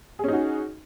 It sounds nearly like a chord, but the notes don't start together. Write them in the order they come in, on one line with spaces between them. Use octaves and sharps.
G#4 C#4 D#4 F#4